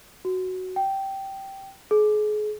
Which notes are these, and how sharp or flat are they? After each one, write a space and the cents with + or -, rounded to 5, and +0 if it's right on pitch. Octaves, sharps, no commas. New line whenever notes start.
F#4 +5
G5 -10
G#4 +35